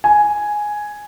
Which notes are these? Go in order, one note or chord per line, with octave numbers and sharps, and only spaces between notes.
G#5